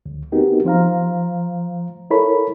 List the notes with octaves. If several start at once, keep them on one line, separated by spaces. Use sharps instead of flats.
D2
B3 C4 D#4 F#4 G4 A#4
F3 C5 F5 A#5
E4 A4 A#4 C#5 B5